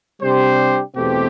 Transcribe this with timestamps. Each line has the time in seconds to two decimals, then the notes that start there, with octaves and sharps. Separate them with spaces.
0.21 C3 G3 D4 G4 C5
0.95 E2 B2 A3 C4 G4